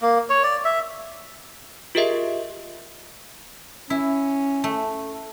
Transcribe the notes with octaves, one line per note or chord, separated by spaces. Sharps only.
A#3
C#5
D5
E5
F4 G4 G#4 A#4 D#5 E5
C#4 E4
A3